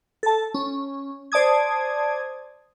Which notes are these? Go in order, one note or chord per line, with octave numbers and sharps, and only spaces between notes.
A4 A5
C#4
C5 D5 A5 D#6 G#6